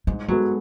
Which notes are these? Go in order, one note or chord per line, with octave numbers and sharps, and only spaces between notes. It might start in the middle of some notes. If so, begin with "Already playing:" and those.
G#2 G#3
F#3 G#3 B3 F#4 A4